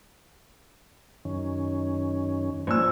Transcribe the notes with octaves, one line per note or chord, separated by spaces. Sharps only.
F#2 D#3 C#4
A#1 G#5 E6